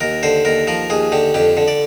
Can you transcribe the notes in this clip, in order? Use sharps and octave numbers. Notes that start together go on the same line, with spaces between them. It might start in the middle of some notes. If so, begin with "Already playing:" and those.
D#2 A#4
D3 C5
D#2 A#4
F3 A#4
D#2 G#4
D3 G4
F2 G4
D3
D5